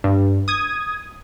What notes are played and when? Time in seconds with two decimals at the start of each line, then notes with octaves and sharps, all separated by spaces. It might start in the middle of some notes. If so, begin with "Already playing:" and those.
0.04 G2
0.48 D#6 G#6